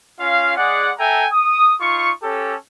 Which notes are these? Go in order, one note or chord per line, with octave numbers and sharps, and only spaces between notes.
C#4 F4 F5
G#3 G#4 D5 F#5
A4 E5 G5 G#5 A#5
D#6
D#4 F4 C#6
C#4 G4 A4